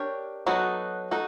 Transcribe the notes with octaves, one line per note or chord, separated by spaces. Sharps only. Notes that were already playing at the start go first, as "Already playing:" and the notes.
Already playing: D4 G4 A#4 C#5
F#3 B3 D#4 F#4 A4
D#4 F#4 A4